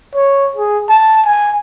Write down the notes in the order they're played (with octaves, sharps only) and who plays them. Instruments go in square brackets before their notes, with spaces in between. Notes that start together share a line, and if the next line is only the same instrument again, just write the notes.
[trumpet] C#5
G#4
A5
G#5